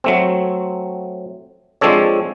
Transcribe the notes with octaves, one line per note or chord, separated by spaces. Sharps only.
F#3 A3 C4
F3 G#3 C4 D4 A4 C#5